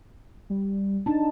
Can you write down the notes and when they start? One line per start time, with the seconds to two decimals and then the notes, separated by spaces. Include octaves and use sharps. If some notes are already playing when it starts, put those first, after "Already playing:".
0.50 G3
1.06 D4 D#4 A5